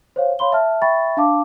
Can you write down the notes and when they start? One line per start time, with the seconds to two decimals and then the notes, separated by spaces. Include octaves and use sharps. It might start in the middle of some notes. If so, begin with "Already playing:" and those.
0.16 C5 C#5 F5
0.39 C#5 F5 B5 C6 G7
0.52 E5 A5 F6
0.82 E5 G5 B5 C#6 A6
1.17 D4 F5 A5 D6